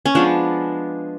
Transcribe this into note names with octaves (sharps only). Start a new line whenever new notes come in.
C#4
F3 G#3 B3 D4